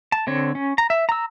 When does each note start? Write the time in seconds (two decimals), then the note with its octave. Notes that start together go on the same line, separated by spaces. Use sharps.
0.12 A5
0.27 D3 C4 C#5
0.55 C#4
0.78 A#5
0.90 E5
1.09 A#5 E6